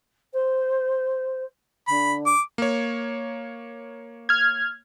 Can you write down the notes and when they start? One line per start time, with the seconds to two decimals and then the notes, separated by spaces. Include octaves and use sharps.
0.33 C5
1.88 D3 B5
2.26 D6
2.58 A#3 C#5
4.29 F6 G#6